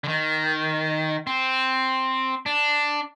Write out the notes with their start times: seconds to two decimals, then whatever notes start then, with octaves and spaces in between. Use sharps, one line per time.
0.04 D3
0.08 D#3
1.27 C4
2.46 D4